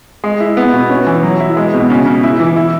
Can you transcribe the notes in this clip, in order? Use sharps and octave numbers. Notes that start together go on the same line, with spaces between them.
G#3
E4
B3
B2
C#4
E3
F#3
E4
G#3
B2
C#3
C#3
E4
E3
E4